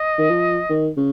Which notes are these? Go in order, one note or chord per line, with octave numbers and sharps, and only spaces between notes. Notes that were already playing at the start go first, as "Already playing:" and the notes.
Already playing: D#5
D#3
F3
D#3
C#3